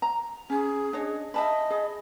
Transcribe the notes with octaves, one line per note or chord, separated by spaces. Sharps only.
A#5
C#4 G#4
D4 C#5 D#5
D#5 E5 A5 B5
G#4